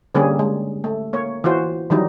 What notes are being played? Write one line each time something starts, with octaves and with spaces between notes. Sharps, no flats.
D3 G3 A#3 C#4 G4 G#4
G#3
A3
A#3 C#5
E3 F4 F#4 C5
D#3 E3 F#3 G3 D#4